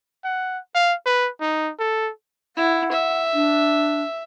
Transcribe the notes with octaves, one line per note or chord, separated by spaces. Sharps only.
F#5
F5
B4
D#4
A4
E4 F#5
E5
D4